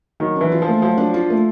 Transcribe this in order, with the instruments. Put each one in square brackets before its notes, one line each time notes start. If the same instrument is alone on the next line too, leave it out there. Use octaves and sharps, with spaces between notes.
[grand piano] D#3 [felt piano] F#3
[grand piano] E3 [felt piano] D4
[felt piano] F4
[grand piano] F3
[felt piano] A3
[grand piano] F3 [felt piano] F#3
[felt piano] D4
F4
A3